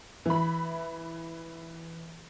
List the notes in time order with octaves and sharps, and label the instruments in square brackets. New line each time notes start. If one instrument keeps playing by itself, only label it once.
[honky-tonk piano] E3 B5